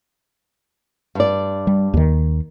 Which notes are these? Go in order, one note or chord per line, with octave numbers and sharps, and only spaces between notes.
G2 D5
G3
D#2 D#3